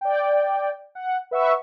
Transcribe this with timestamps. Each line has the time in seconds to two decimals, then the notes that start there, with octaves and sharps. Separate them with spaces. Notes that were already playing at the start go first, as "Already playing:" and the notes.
0.01 D5 G5
0.95 F#5
1.31 B4 E5 F#5 C#6 E6